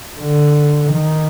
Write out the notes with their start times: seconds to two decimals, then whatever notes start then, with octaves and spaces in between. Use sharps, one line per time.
0.20 D3
0.93 D#3